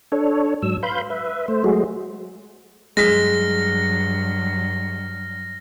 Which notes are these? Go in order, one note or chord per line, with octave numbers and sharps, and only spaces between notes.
D4 A4 C#5
G#2 F#3 E6
B4 F5 B5 C6 G6
B4 E5
A3 C5
F#3 G#3 A3 F#4 G#4
G2 F#3 G#3 F6 A#6 B6